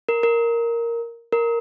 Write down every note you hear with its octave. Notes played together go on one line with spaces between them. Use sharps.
A#4
A#4
A#4